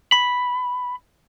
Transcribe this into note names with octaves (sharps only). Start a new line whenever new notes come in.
B5